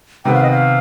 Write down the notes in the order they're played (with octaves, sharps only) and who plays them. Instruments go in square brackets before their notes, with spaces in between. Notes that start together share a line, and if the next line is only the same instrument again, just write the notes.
[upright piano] C3 D#3 B3 [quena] G5
[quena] F5
D#5
F5